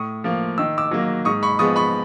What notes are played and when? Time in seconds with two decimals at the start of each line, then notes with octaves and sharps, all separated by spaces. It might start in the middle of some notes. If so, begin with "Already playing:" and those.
Already playing: A2 C#6 D#6
0.24 F3 A#3
0.58 D#3 E6
0.78 D6 E6
0.91 F#3 A#3
1.25 G#2 C#6 D#6
1.43 B5 C#6
1.59 F3 G#3 B3 C#6 D#6
1.76 B5 C#6